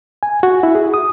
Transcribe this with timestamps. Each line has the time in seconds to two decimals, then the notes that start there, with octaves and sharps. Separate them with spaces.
0.23 G#5
0.43 F#4
0.63 E4
0.75 G#4
0.94 D#6